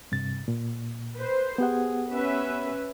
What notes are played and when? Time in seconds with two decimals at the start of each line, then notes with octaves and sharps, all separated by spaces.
0.12 G2 C3 A6
0.48 A#2
1.16 B4 C5
1.58 B3 G4 G#4 F#5
2.11 C#4 B4 E5